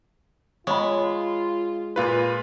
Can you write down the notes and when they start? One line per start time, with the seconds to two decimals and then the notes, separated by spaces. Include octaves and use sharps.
0.67 G#3 F4 C#5 B5
1.96 A#2 F4 B4